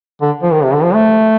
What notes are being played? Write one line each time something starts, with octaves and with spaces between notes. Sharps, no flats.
D3
F3
D#3
C3
D3
F3
A3